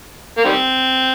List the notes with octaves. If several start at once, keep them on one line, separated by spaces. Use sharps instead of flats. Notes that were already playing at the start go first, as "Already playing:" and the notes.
A#3
D#3 G3 C4